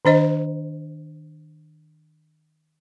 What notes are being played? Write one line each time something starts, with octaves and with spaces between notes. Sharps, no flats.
D#3 D4 C5 D#5